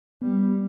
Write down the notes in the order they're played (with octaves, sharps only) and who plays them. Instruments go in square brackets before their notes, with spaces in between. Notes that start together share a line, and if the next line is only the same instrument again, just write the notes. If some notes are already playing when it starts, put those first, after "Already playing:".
[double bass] G3 [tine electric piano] B3